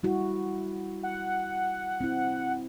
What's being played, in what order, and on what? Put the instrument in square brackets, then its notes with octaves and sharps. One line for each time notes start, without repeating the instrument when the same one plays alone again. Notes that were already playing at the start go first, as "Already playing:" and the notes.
[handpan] G3 E4 F#4
[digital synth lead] F#5
[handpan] C4 E4